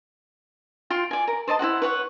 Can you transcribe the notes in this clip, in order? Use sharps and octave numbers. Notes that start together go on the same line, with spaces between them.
F4 G5 C6
D5 G#5
A#4
C5 D5 D#5 A5
E4 F#4 C5 F#5
B4 C#5 F#5